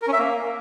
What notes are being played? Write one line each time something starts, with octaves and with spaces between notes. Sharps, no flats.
A#4
C#4
E5
A#3